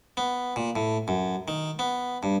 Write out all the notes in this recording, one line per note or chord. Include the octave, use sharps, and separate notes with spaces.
B3
A#2
A2
F#2
D#3
B3
G2